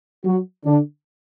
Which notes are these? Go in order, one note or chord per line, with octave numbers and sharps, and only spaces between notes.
F#3 F#4
D3 D4